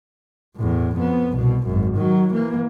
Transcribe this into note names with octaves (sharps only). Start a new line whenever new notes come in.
E2 A2
F2 B3
C2 B2
G#1 F#2
D#3 F#3
E3 A#3